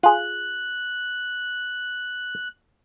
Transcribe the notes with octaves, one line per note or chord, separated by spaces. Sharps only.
F4 G#4 F#6